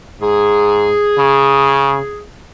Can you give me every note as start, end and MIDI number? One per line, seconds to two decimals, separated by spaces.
0.21 0.95 44
0.21 2.22 68
1.18 1.99 49